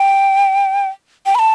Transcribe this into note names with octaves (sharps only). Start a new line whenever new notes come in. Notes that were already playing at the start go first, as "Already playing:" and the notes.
Already playing: G5
G5
B5
A5